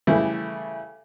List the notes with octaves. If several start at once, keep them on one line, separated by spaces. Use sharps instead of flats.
C#3 E3 G3 A3 E4